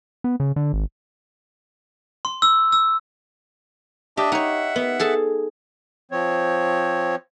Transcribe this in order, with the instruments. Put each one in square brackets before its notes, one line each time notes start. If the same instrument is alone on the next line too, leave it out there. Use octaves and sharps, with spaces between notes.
[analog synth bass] B3
C#3
D3
G#1
[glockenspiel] C6
E6
E6
[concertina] D4 D#5 E5 [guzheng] G4
[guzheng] D#4 C#5 [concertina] E5 F#5
[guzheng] B3
G#4 A4 A5
[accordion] F3 C4 C#5